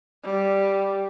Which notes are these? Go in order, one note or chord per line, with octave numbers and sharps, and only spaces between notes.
G3